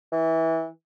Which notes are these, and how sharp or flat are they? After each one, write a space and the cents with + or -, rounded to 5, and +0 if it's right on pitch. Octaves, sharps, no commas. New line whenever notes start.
E3 -20